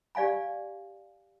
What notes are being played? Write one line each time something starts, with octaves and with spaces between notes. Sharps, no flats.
G4 D5 F5 G#5 B5